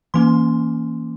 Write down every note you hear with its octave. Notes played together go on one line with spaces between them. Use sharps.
E3 A#3 C#4 C6